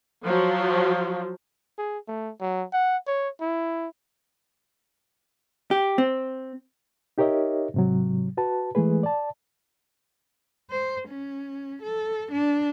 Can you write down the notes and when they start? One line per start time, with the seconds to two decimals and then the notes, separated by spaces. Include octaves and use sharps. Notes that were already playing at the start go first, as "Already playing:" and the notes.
0.25 F3 F#3
1.78 G#4
2.08 A3
2.41 F#3
2.73 F#5
3.07 C#5
3.41 E4
5.71 G4
5.98 C4
7.18 D#4 G4 A#4 C#5 D#5 E5
7.74 G#2 C3 F#3
8.37 F#4 B4 A5
8.75 E3 G#3 A3 G#4 B4
9.03 D5 A5
10.70 C5
11.09 C#4
11.83 A4
12.32 D4